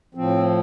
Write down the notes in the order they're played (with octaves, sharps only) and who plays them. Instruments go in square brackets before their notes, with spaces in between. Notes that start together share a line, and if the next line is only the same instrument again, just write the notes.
[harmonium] A2 F3 C4